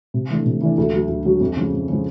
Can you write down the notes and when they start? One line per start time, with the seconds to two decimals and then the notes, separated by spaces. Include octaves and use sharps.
0.14 C3
0.30 E3 A3 D4
0.46 C3
0.61 E3 A3 D4
0.78 D2
0.93 D3 F#3
1.09 D2
1.25 D3 F#3
1.41 F2
1.57 C#3 F3
1.73 F2
1.89 C#3 F3